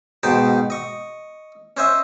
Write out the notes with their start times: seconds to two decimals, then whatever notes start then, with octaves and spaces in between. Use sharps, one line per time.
0.23 G#2 B2 D#4 C5 G5 A5
0.70 D#5 C#6
1.77 C#4 C5 D#5 E5